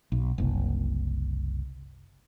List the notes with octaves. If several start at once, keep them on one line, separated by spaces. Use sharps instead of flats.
B1
F#1 C2